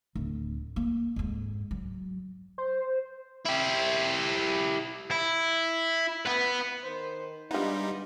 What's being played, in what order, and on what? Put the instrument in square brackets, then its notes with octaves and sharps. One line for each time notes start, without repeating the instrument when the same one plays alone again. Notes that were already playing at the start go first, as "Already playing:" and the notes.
[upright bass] D1
A#3
F2 G#2
F#3
[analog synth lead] C5
[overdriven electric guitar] E4 G4
[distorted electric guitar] E4
B3 B4
[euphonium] D#3 [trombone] C5
[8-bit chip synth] G3 D#4 [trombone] G#3 [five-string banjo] B3 F4 [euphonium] D4